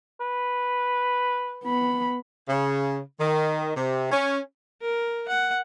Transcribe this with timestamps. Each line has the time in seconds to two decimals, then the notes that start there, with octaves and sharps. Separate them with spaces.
0.20 B4
1.64 B3 B5
2.49 C#3
3.20 D#3
3.75 C3
4.12 C#4
4.82 A#4
5.29 F#5